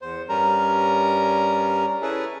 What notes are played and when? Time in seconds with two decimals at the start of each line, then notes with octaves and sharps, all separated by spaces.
0.02 E2 C5
0.29 G2 G3 C#4 A#4 A#5
2.02 C#4 E4 G#4 A4 B4